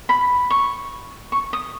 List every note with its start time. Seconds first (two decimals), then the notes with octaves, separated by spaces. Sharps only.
0.09 B5
0.50 C#6
1.32 C#6
1.53 D#6